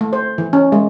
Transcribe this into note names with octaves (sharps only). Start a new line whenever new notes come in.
A3
C5
E3
C#4
G#3